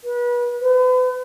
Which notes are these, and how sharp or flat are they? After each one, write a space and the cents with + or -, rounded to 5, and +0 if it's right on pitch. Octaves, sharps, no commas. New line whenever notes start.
B4 -30
B4 +40